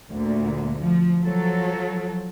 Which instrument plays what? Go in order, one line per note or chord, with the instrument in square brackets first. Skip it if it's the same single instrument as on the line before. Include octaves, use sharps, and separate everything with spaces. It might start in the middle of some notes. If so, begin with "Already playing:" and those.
[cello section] D2 A#2
F3
F3 F#3 A4